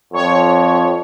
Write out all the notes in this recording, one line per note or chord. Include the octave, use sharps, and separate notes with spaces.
F2 C#5